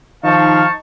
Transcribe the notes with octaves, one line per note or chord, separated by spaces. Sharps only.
D#3 F3 D#4 F5 A5 C#6